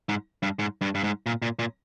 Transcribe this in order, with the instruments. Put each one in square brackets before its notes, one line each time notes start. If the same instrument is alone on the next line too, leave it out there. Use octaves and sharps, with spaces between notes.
[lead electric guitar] G#2
G2
G#2
G2
G2
G#2
A#2
A#2
A#2